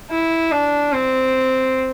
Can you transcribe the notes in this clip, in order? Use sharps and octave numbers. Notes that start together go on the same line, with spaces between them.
E4
D4
C4